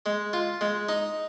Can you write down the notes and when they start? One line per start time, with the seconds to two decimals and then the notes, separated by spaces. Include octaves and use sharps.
0.06 G#3
0.33 F4
0.61 G#3
0.89 D#4